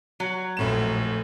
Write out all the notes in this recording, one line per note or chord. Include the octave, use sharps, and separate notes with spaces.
F#3
F1 A#1 A2 E7